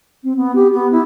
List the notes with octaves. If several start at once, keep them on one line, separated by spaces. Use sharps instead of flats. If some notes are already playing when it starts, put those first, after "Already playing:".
C4
B3
G4
B3
E4